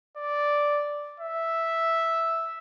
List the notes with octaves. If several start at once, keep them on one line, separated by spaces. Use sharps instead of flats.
D5
E5